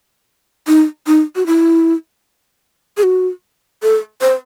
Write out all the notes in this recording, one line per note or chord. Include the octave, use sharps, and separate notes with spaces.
D#4
D#4
F#4
E4
G#4
F#4
A4
C5